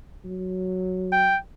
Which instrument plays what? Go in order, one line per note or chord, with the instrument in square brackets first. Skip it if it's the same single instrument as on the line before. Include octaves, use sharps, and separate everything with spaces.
[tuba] F#3
[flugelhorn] G5